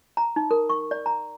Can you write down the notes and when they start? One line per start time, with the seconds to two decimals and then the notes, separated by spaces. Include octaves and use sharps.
0.17 A#5
0.36 D#4
0.51 A#4
0.69 C#6
0.91 D5
1.06 A#5